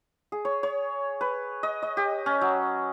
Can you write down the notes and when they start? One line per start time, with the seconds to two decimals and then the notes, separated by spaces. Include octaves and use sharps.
0.32 G#4
0.45 C#5
0.63 C#5
1.21 B4
1.63 D#5
1.82 D#5
1.97 G4
2.26 C#4
2.41 F#3